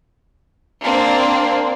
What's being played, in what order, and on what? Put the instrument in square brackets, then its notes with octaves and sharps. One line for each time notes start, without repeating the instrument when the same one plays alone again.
[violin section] A#3 C4 D4